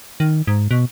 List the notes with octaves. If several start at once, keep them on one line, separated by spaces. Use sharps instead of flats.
D#3
G#2
B2